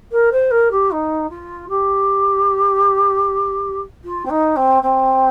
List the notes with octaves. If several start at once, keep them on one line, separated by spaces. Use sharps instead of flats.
A#4
C5
A#4
G4
D#4
F4
G4
F4
C4
D#4
C4
C4